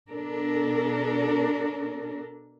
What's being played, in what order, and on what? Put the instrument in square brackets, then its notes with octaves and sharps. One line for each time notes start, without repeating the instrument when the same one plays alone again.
[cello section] B2 D4 A4 A#4